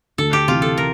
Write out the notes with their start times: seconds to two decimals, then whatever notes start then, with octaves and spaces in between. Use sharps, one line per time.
0.18 D2 A4
0.33 G4
0.48 C3 E3 F4
0.62 A4
0.78 A#4